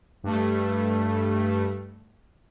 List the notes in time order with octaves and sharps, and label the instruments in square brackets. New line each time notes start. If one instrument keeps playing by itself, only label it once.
[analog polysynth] G2 A3